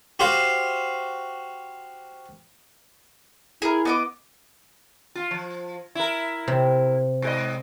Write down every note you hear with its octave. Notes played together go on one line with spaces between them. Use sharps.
F#4 G4 C5 F5
E4 G#4 A#4
B3 D#5 D6
F4
F3
E4 A#4
C3
G#2 G4 D#5